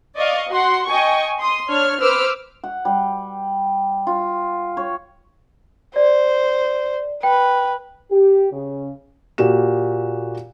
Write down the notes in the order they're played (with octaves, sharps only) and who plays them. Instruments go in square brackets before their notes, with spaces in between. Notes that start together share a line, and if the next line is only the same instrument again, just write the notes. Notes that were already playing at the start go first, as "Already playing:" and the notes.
[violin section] D5 D#5 F5 C#6
F#4 F#5 C6
D#5 G5 G#5 C#6
C6 D#6
D4 C#5 F6
B4 C5 D6 E6 F6
[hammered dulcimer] F#5
G3
F4
C#5
[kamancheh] C5 [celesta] D5
[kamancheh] B4 [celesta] G5
[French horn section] G4
C#3
[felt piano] A#2 F#4 G4 E7